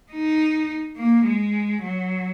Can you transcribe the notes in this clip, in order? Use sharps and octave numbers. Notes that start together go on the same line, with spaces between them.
D#4
A#3
G#3
F#3